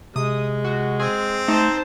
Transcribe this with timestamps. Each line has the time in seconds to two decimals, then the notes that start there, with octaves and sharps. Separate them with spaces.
0.16 C3 G#3 D#6
0.64 F#4
1.00 C4 G#4
1.48 A3 D#4 C5 A5